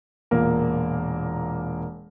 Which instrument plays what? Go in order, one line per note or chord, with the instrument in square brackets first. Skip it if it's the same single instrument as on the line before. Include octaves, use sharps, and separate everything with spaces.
[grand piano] E1 A#2 A#3 A#4